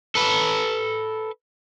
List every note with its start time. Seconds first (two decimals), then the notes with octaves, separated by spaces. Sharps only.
0.15 A4 B4